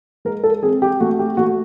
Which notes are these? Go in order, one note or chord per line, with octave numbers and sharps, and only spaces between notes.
G#3 A#4
A4
C4 G#4
G4
A3 F#4
G4
A3 F#4